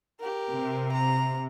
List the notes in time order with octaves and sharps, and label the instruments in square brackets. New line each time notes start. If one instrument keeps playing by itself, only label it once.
[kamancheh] G4 A#4
[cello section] C3
[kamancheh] A#5